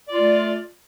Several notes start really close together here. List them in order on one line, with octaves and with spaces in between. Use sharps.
D5 F4 A3